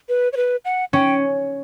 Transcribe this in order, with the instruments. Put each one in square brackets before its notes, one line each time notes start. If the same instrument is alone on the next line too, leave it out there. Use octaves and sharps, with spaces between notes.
[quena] B4
C#5
B4
F#5
[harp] C#4 [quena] G5